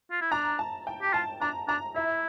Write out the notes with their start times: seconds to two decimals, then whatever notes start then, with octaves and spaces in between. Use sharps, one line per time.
0.11 F4
0.21 E4
0.32 D4 A#5
0.59 A5
0.87 G5
1.02 G4
1.13 F4 A5
1.41 D4 A#5
1.68 D4 A#5
1.95 E4 E5